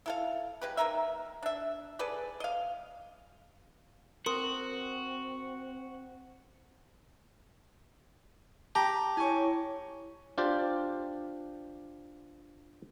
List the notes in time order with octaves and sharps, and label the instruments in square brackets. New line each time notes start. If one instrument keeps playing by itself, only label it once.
[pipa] E4 A4 F5
G#3 G4 B4
A#3 D#4 A#4 E5
D4 E5
G#4 A4 B4 D5
D#5 F5
[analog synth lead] C4 [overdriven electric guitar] F#4 [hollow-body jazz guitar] A#4 [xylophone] C6 D#6
[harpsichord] G4 [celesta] A5 [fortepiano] A#5
[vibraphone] E4 C#5 [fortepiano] G#5 C#6
[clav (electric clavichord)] D4 F4 G4 C5 D5